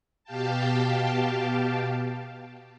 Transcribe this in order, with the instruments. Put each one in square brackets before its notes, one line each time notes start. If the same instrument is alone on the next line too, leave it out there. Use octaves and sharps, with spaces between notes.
[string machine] B2 G4 F5 G5 A5